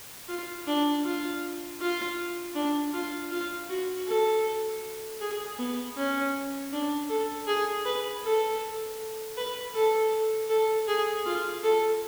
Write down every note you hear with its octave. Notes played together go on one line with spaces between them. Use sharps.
F4
D4
F4
F4
D4
F4
F4
F#4
A4
G#4
B3
C#4
D4
A4
G#4
B4
A4
B4
A4
A4
G#4
F4
A4